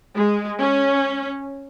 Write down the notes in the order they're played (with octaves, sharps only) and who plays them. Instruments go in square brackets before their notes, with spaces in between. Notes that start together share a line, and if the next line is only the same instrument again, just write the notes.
[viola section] G#3
C#4